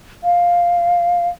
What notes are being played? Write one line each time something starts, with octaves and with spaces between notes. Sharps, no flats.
F5